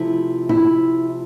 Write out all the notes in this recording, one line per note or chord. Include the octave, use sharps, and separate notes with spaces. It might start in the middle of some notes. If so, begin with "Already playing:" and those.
Already playing: C3 F3 A3 E4
E4